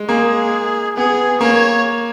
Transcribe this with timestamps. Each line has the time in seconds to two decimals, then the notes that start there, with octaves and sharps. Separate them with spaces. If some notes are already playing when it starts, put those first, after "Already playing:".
Already playing: G#3
0.09 A#3 G#4
0.97 B3 G#4
1.41 A#3 C#5